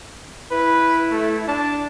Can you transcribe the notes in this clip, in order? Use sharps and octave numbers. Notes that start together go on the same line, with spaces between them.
E4 B4
A3
D4 A5